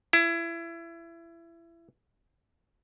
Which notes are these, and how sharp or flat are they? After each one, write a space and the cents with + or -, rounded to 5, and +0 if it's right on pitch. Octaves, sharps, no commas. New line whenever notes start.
E4 +25